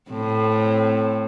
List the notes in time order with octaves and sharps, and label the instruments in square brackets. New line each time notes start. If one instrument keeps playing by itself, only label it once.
[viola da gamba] A2 C4